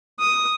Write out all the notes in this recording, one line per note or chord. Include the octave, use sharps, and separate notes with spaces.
D#6